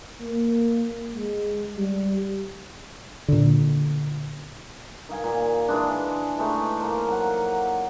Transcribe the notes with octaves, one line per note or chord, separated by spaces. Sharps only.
A#3
G#3
G3
A#2 D3
D#3 D#5 F5 G#5
A#2
E3 G#3 D4
E3 G#3 A3 D#4
A#3 A#4 C5
F#3 F#5